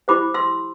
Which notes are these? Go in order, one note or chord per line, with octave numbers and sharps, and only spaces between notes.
E4 G4 C5 B5 D6
C6 E6